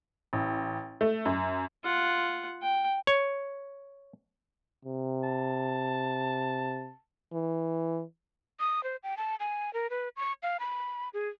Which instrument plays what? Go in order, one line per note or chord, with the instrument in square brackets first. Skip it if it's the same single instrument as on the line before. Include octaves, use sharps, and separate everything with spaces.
[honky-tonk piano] A1
A3
F#2
[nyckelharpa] F4 F#5
G5
[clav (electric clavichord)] C#5
[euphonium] C3
[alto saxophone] A5
[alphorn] E3
[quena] D#6
C5
G5
A5
G#5
A#4
B4
C#6
F5
B5
G#4